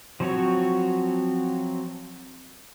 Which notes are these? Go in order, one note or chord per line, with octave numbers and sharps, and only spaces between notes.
F3 F#3 C4 F#4 C#5